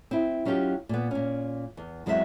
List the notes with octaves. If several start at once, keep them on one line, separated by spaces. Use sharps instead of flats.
C4 E4
F#3 C#4 D#4 F4 G4
A#2 B3
A#2 C#4
E2
E2 F#3 G#3 C4 E4 E5